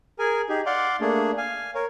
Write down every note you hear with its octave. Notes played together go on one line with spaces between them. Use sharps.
G#4 A#4 G#5
D#4 G4 G#4
D5 F5 F#5 C6 D6
A3 A#3 D4 G#4
F5 G#5
A#4 C#5